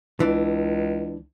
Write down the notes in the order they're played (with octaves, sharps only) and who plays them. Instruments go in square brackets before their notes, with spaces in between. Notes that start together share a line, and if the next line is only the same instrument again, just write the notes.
[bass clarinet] C#2 [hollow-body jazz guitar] E3 D4